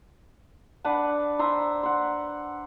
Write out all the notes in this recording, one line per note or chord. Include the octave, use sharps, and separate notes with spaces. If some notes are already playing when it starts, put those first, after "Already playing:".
D4 B4 F#5 A5
C5 E5 A#5 C6
F#5 C6